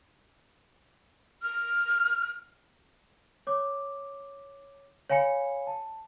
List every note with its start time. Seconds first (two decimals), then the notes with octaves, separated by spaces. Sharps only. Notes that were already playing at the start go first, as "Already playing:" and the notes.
1.42 F6
3.47 C#5 D6
5.10 C#5 F5 G#5 B5 C#7
5.67 A5